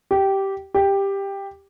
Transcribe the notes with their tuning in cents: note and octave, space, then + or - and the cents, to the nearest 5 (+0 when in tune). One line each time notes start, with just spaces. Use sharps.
G4 -10
G4 +10